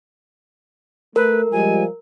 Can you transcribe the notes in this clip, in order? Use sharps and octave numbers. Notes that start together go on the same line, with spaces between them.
A3 A#4 B4
F3 G3 G#3 G#5